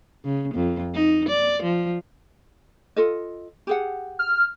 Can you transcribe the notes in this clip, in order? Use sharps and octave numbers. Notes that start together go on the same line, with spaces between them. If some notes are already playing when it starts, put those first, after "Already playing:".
C#3
F2
D#4
D5
F3
F4 A4 D#5
G4 G#4 F#5
F6